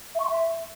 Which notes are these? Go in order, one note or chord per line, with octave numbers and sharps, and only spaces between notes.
E5
C#6
C6
E5